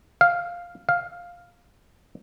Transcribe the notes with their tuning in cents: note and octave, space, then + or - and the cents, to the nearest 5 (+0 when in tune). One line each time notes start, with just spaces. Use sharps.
F5 +0
F5 +5